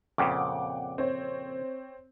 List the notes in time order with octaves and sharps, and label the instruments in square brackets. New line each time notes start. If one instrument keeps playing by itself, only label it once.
[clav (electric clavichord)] F2 A#2 C#3 [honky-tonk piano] F#5 G5 D6
[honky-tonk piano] C4 C#5